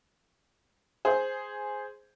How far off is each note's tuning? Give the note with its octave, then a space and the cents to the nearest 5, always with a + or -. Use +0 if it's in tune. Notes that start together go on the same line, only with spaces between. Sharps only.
G#4 +0 C5 +0